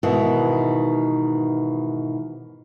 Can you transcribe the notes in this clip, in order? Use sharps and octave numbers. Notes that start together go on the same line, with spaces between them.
G#2 B2 D#3 E3